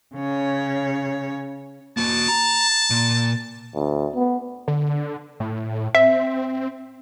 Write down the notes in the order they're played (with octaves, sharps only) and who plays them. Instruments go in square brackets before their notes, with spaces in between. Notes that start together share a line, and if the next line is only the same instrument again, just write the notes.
[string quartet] C#3 C#5
[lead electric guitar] A#3 F#4 [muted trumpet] A5
[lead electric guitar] A#5
A#2
[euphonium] D2
B3
[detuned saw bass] D3
A2
[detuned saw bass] C4 [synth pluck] E5